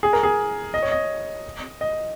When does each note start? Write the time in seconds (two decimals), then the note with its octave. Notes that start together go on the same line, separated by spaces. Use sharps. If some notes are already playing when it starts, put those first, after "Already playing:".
0.03 G#4
0.13 A#4
0.23 G#4
0.74 D#5
0.82 C#5
0.91 D#5
1.81 D#5